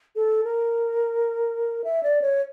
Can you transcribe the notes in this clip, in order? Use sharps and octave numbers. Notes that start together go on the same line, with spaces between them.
A4
A#4
E5
D5
C#5